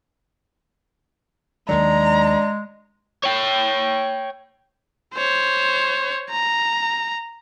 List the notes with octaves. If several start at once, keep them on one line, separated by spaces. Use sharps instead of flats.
D#2 D#3 F#3 G#3 D4 A#5
C#5 G5
C5 C#5
A#5